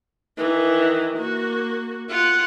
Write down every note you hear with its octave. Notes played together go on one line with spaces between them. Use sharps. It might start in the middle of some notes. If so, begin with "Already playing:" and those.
D#3 E3
A#3 F#4
F4 F#5